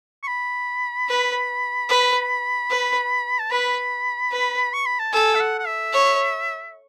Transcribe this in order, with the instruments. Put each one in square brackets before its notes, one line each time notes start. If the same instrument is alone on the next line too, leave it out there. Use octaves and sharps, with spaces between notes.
[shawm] C#6
B5
[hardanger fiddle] B4
B4
B4
[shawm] A5
[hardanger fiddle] B4 [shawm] B5
[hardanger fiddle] B4
[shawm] C#6
B5
A5
[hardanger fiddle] A4 [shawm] G#5
[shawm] E5
F#5
F#5
E5
[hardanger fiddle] C#5